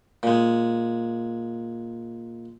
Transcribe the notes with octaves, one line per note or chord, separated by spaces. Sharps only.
A#2 G#3